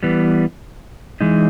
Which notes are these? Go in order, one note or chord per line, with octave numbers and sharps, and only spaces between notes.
E3 G3 B3
E3 G#3 D#4